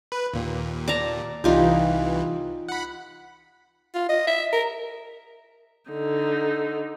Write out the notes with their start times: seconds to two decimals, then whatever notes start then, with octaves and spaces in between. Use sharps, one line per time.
0.12 B4
0.33 D#2 A#2
0.88 D5 A5 A#5
1.44 C2 E3 D#4 F4 G4
2.69 F#5 B5
3.95 F4
4.09 D#5
4.27 E5
4.53 A#4
5.90 D3 D#4